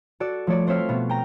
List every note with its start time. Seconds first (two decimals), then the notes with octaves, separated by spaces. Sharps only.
0.20 F#4 A4 D5
0.47 F3 A3 C#5 D5
0.67 C4 C5 C#5 E5 F5
0.89 B2 B3 F4
1.09 G5 A#5